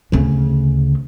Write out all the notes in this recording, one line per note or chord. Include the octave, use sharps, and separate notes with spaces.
D2 C#3